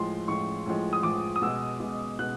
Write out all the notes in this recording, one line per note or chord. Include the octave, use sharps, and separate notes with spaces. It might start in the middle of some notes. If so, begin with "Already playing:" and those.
Already playing: A2 F3 G#3 C6
A2 F3 G#3 C#6
A2 F3 G#3
D#6
A2 F3 G#3 D6
D#6
B2 G#3 E6
B2 G#3
B2 G#3 F#6